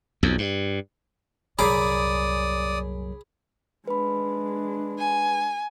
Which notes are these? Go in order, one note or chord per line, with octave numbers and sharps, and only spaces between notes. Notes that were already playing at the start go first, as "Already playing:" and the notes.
B1 F2
G2
C2 F#2 A#2 G#4 D5 B5 D6 D#6
G#3 D4 B4 B5
G#5